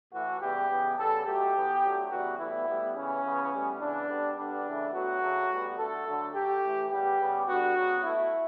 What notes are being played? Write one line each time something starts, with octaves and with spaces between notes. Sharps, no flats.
A2 E3 A3 F#4
C#3 E3 G3 B3 G4
C#3 E3 B3
C#3 G3 B3 A4
B2 F#3 A3 G4
A2 E3 B3
D3 F#3 A3
C#3 E3 G3 B3 F#4
A2 E3 G3 B3 E4
A2 G3 B3
C#3 E3 B3 C#4
C#3 E3 B3
A2 G3 B3
C#3 E3 B3 D4
D3 G3 B3
D3 G3 B3 D4
C#3 E3 A3
A2 F#3 B3 F#4
C#3 F#3 A3
A2 G3 B3
D3 A3 A4
D3 F#3 A3
D3 A3 G4
A2 E3 A3
C#3 G3 B3 G4
C#3 G3 B3
D3 G3 B3 F#4
C#3 F#3 B3
B2 A3 E4